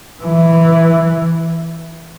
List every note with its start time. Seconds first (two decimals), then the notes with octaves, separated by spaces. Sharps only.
0.23 E3